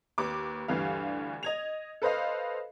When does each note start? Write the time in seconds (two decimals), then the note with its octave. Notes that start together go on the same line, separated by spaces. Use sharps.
0.18 D#2 B4 D6
0.68 D2 G2 E3 G3 F5
1.43 D#5 G#6 F7
2.02 A4 B4 C5 D#5 F5